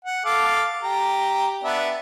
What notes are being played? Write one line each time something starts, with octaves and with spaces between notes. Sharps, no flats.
F#5
A4 F5 D6
G4 A#5
B3 D4 E5